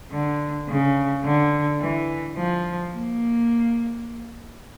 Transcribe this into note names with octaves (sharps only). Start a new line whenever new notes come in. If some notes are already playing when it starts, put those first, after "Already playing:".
D3
C#3
D3
E3
F3
A#3